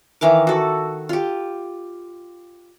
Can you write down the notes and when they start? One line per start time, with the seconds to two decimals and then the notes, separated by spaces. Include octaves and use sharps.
0.21 D#3 E3 F5 D6
0.47 F#4 A4
1.09 F4 G4